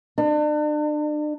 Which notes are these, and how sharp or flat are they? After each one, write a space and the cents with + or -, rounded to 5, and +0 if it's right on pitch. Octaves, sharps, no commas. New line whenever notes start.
D4 +40